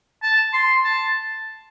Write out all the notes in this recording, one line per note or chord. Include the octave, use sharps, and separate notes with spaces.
A5
C6
A5